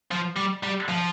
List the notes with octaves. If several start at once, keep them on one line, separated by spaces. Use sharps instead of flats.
F3
G3
G3
F3